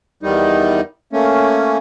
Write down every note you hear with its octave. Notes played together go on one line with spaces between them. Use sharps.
E2 D#3 G3 D#4
A3 A#3 C#4